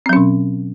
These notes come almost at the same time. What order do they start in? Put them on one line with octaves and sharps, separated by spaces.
C4 F#3 C#4 B2